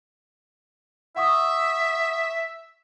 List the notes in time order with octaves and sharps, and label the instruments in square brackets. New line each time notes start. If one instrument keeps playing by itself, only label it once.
[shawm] E5 [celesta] F#5 C#6 D#6